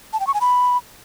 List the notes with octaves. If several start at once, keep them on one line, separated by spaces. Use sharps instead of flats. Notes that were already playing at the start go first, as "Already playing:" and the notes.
A5
G5
C#6
G#5
B5